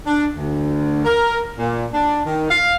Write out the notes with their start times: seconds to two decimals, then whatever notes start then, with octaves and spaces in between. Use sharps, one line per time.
0.07 D4
0.34 D2
1.05 A#4
1.57 A#2
1.93 D4
2.26 D#3
2.51 F5